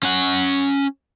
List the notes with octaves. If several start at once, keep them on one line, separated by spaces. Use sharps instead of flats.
C#4 F#5